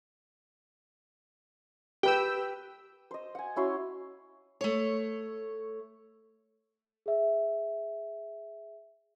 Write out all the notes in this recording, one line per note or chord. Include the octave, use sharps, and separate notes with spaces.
G4 B4 G5 E6
C5 D#5
F#5 G#5
C#4 E4 F#4 C6
A3 C#5
G#4 E5